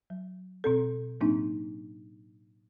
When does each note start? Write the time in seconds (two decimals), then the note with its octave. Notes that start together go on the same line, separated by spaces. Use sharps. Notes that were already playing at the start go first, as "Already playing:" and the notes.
0.10 F#3
0.64 B2 C4 A4
1.20 A2 F#3 A#3 C4 D4 D#4